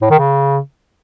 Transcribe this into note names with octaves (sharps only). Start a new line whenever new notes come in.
A2
D#3
C#3